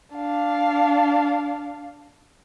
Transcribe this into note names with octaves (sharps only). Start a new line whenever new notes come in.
D4 F5